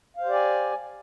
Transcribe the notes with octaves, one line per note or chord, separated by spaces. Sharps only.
G4 C5 D5 F5 G#5